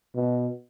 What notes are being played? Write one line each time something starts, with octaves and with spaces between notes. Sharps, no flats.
B2